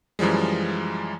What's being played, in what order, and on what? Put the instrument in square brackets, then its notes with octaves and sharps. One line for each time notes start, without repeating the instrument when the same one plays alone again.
[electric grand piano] F#2 E3 F3 G3 G#3